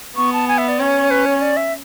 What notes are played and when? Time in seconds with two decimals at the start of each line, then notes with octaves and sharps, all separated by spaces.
0.16 B3 C#6
0.33 A5
0.48 G#5
0.58 E5
0.68 D5
0.80 C#4 C#5
1.10 B4
1.26 C#5
1.42 D5
1.57 E5